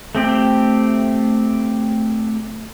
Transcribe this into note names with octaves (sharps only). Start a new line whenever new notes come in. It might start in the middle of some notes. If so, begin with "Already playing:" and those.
A3 C4 G4